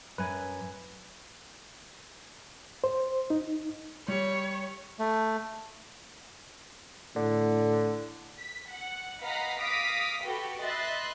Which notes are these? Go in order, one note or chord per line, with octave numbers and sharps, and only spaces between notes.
F#2 B4 G#5
C5
D#4
G3 C#5
A3
A2 D3
B6
F#5
B4 D#5 F5 F#5 A#5 B6
F5 D6 D#6 A#6 B6
F#4 G4 A4 B4
B4 D#5 E5 C6 F#6 A6